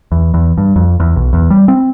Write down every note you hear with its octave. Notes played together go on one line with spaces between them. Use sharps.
E2
E2
G2
F2
E2
B1
E2
G3
C4